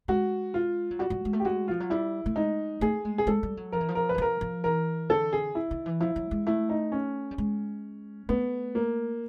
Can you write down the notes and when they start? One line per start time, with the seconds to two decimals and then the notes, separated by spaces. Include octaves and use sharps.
0.08 G#3 F#4
0.54 F4
0.91 F#3
0.99 G3 F#4
1.10 G3
1.25 G#3
1.33 A3
1.40 G4
1.45 G#3 F#4
1.68 F3 F4
1.80 F#3
1.90 G3 E4
2.26 A3
2.36 G#3 D#4
2.81 A3 G#4
3.05 G#3
3.18 G#4
3.27 G#3 A4
3.43 G3
3.57 F#3
3.72 F3 A#4
3.81 E3
3.88 F3
3.95 A#4
4.09 B4
4.14 E3
4.18 F3 A#4
4.41 F3
4.64 E3 A#4
5.09 D3 A4
5.33 G#4
5.55 E4
5.71 D#3
5.86 E3
6.00 F3 E4
6.16 F#3
6.31 G#3
6.46 A3 E4
6.69 D#4
6.92 C#4
7.31 G3
7.38 G#3
8.29 A3 B3
8.75 A#3